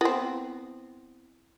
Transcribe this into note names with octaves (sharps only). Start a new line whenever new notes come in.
B3 C4 E4